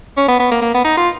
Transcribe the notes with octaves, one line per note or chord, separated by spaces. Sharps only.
C#4
B3
B3
A#3
A#3
B3
D#4
F4